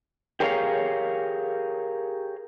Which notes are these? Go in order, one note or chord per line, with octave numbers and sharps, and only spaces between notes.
G4 G#4 A#4 C#5 E5 F5